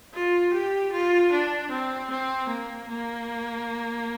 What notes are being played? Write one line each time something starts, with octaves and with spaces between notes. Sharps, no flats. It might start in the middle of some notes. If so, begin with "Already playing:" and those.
F4
G4
F4
D4
C4
C4
A#3
A#3